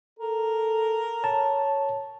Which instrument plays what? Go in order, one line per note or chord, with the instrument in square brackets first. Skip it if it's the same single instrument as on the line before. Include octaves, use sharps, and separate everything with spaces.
[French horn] A4 [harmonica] A#4
[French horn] C#5 [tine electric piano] A5